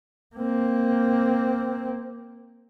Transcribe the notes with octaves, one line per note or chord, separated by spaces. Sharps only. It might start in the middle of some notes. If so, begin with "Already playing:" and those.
A#3 C4